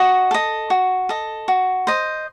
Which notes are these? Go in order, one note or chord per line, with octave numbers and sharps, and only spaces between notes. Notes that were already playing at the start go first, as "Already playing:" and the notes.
Already playing: F#4 D#5
A4 D#5
F#4
A4 D#5
F#4
C5 D#5